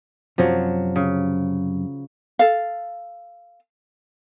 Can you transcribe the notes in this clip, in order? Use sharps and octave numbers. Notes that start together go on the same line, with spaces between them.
F#2 C3 F3 F#3
C#3
A4 F5